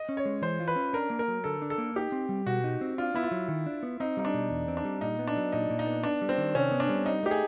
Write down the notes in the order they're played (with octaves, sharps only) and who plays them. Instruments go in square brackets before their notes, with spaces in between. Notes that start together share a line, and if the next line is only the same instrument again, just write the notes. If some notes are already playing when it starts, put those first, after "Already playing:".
Already playing: [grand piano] D#5
[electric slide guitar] C#4
[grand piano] C#5
[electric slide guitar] G#3
[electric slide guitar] E3 [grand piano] C5
[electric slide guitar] F4
[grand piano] B4
[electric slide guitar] C#4
[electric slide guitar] D4 [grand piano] A#4
[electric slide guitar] A#3
[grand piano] A#4
[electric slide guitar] F#3
[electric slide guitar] D3 [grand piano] A4
[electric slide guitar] D4
[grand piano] A4
[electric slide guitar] A#3
[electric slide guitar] D#4 [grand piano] G4
[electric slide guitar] C4
G3
[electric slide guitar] B2 [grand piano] F#4
[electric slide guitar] D#4
C4
[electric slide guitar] D4 [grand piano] F4
[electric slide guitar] B3 [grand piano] E4
[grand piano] F4
[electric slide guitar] F#3
D#3
D4
B3
[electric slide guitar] C4 [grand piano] D#4
[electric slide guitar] G3 [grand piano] D#4
[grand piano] D4
[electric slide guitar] B2
E2
C4
[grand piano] D4
[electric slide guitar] G3
[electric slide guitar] A#2 [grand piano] D#4
[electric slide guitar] B3
[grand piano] D4
[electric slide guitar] F#3
[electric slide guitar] A#2 [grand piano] D#4
[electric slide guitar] A#2
[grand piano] D#4
[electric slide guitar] B3
[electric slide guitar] B3 [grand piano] D4
[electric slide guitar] G3
[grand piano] C4
[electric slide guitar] D#3
[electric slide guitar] C3 [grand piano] C#4
[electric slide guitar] B3
[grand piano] D4
[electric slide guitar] G3
[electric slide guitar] C4 [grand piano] D#4
[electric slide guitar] A3 [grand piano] G4
[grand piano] G#4